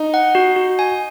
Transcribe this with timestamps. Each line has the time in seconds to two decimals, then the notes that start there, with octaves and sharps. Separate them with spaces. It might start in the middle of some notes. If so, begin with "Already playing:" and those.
Already playing: D#4
0.14 F#5
0.35 F#4
0.56 F#4
0.79 G#5